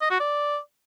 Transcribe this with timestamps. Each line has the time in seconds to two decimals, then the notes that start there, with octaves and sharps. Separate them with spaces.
0.01 D#5
0.11 F#4
0.20 D5